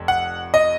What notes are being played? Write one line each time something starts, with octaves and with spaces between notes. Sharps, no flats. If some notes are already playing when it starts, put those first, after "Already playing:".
Already playing: F1 F2
F#5
D#5